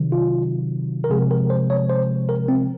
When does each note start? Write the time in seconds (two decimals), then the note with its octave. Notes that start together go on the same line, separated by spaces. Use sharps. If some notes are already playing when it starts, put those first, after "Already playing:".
Already playing: C3 D#3 F#3
0.12 F4
1.04 A#4
1.10 C3 F3 G#3 G#4
1.31 A#4
1.50 C5
1.70 C#5
1.89 C5
2.29 A#4
2.48 C4